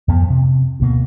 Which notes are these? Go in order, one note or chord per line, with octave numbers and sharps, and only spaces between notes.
F2 F3 B3
C3
D2 B2 A#3